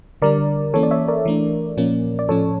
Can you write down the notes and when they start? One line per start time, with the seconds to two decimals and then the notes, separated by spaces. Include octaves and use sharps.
0.22 D3 G3 D4 A#4 D5
0.74 E3 A#3 C#4 A4 C#5
0.83 D5
0.91 C#5 E5
1.08 A#4 D5
1.25 E3 A3 D4
1.77 A#2 F3 A#3 C#4
2.19 D5
2.29 A2 F3 C#4 A4 C#5